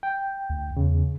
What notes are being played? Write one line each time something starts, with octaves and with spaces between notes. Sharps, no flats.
G5
D2
E2 C#3